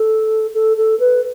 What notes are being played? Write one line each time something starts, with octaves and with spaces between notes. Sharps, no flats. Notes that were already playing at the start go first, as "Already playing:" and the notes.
Already playing: A4
A4
A4
B4